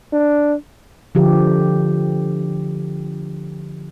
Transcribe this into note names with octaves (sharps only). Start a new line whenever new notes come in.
D4
D3 F3 G4